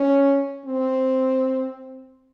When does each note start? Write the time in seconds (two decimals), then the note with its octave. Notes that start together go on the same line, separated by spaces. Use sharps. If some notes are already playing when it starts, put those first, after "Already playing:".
Already playing: C#4
0.66 C4